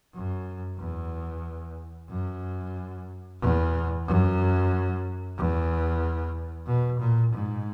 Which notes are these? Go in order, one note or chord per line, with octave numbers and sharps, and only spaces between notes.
F#2
E2
F#2
E2
F#2
E2
B2
A#2
G#2